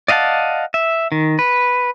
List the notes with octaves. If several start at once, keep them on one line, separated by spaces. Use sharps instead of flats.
D5 D#5 F5 F#5 A5
E5
D#3
B4